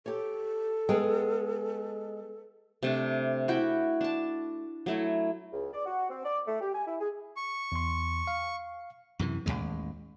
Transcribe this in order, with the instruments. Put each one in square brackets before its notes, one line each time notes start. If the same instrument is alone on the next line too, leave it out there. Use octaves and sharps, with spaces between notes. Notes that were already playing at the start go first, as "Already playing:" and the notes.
[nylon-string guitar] G4 C#5 [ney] A4
[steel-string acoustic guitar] G#3 [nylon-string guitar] B3 G#4 G5
[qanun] C3 A3 D4
E4 F#4 G5 B5
D4 A5
F#3 A3 E4
[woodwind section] C#2
D5
F#4
C4
D5
A3
G4
G#5
E4
G#4
[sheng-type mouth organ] C#6
[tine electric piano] E2 C6
F5
[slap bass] F#2 C3 E3
A1 D#2 G#2 G#3